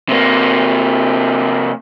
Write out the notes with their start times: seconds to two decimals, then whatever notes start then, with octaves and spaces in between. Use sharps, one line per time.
0.09 C3 A#3